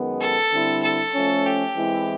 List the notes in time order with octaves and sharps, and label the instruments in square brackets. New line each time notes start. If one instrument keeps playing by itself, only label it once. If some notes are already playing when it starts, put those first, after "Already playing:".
Already playing: [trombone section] F#2 D#3 G#3 B3
[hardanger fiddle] A4
[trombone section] D3 G3 C4 E4
[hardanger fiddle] A4
[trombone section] F3 A3 C#4
[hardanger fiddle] G4
[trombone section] E3 G#3 C4 E4